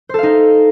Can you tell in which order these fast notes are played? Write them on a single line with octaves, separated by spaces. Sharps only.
C5 A4 F5 D#4